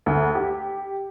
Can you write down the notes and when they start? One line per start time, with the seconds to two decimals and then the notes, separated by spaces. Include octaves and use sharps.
0.06 D2
0.35 G4